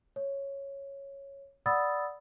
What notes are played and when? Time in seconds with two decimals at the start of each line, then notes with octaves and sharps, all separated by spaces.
0.16 C#5
1.66 D5 F#5 B5 D#6 E6 A6